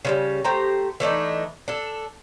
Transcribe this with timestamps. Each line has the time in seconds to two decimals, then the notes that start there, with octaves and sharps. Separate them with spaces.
0.05 C#3 F#3 G3
0.44 A3 G4 C5 A#5
1.00 E3 A3 D4 D#4
1.68 D4 A4